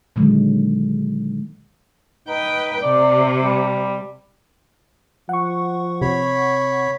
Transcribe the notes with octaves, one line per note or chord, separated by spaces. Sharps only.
A#2 D3 D#3 F#3 G#3
D#4 B4 G5
C3 D5
G3
F3 F#5 C#6
C3 C#5 B5